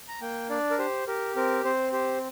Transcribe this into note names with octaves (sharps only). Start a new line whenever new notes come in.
A#5
A#3 G5
D4 D5
A#4
G4 C5
G4 A#4
C4 A#4
C4 C5
G4 C5